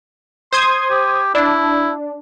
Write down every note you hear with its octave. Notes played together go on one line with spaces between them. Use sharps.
C5 C6 D#6 G#6
G4
D4 E4